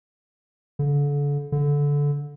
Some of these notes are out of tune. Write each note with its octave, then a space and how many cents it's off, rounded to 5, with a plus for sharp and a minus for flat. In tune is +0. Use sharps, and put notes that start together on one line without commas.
D3 -35
D3 -20